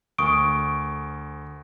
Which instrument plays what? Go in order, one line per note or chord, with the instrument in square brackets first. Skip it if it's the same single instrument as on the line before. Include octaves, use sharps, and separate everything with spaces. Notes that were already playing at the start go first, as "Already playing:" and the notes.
[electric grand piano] D2 A#4 G#5 [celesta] C#6 D#6 D7